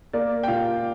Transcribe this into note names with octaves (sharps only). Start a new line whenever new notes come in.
A#3 D5
G5
A#2 F5